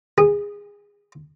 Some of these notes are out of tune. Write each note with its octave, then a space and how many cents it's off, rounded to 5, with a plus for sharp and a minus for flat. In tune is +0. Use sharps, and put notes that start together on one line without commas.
G#4 -20